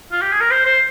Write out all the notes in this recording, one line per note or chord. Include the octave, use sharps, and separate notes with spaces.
F4
G4
G#4
A#4
C5
C5